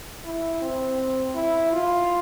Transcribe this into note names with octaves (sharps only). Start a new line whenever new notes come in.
E4
C4
E4
F4